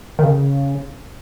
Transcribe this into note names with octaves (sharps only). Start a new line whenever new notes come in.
D#3
C#3